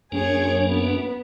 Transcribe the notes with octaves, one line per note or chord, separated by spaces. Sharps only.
F#2 A#3 C#4 D4 G#4 C#5
B3